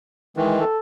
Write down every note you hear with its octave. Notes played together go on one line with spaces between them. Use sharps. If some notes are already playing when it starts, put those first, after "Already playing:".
D#3 E3 G#3
A4